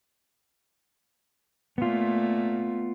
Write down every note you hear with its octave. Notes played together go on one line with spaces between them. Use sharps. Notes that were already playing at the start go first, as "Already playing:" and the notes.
A#2 A3 B3 F4